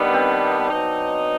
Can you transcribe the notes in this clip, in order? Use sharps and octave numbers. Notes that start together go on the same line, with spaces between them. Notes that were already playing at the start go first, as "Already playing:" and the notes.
Already playing: D#3 G3 B3 D4
C4
F#3 B3 D#4